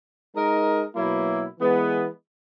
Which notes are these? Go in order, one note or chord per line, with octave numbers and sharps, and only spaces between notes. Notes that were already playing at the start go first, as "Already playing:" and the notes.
G#3 D#4 A#4 D#5
B2 F#3 A#3 E4
E3 G#3 B3